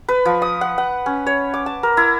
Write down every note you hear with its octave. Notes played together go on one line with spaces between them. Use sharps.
B4
F3
D#6
F#5
F#5
C#4
C#5
D6
A5
A#4
E4